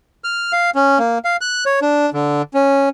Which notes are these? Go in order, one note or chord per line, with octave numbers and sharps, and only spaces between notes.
F6
F5
C#4
A#3
F5
F#6
C#5
D4
D3
C#4